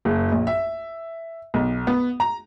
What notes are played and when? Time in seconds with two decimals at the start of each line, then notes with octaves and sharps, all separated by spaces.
0.05 F#1
0.32 A#1
0.47 E5
1.54 B1
1.87 B3
2.20 A#5